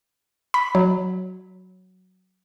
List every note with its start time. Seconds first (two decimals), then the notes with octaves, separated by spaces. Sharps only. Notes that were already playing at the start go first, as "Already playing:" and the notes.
0.54 B5
0.75 F#3